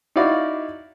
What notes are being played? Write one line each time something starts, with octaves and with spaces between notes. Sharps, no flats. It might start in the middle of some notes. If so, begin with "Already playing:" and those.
D#4 E4 F#4 D5 F5